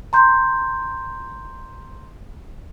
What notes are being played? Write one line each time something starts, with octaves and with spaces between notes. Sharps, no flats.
A#5 C6 G6